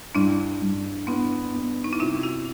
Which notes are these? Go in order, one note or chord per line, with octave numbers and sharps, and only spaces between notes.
G2 D4 E4
G2
B3 D4 E4
B3
D#4
E4
C3 D#4 F4
E4 F#4